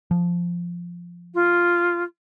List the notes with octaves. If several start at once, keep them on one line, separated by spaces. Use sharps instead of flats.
F3
F4